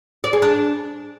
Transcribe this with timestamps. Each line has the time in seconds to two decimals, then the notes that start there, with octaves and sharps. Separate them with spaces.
0.24 D5
0.33 G#4
0.42 D4